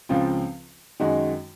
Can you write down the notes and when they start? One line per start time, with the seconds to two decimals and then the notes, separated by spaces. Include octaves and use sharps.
0.09 C#2 C#3 F3 C4 F4
1.00 F#2 D#3 G#3 D#4 F#4